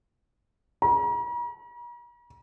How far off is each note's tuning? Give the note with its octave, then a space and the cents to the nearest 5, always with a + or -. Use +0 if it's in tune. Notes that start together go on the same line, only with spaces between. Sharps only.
A#5 +45